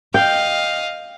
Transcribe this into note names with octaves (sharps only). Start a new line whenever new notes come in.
D#5 F5 G5